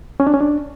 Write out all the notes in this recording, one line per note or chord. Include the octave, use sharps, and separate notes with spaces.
C#4
D4
C#4
D4